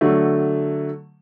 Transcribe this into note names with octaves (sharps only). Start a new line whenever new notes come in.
D3 F#3 A3